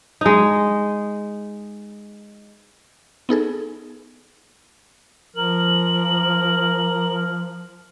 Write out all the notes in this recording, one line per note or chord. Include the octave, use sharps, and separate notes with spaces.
G#3 D#4
B3 D#4 G#4 A4
F3 A#4 F#7